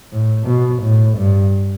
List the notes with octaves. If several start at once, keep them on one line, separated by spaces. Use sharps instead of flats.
A2
B2
A2
G2